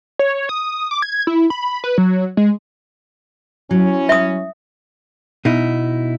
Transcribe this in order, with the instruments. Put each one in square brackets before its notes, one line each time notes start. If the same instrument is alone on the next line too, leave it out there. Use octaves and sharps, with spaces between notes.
[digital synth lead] C#5
D#6
D6
G#6
E4
B5
B4
F#3
G#3
[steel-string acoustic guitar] F#3 [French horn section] C#4 E4
[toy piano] E5 D#6
[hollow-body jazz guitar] B2 D#4 E4